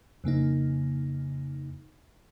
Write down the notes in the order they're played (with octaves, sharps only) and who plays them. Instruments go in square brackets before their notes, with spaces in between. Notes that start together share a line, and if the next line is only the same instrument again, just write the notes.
[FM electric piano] F2 C#3 A#3 D#4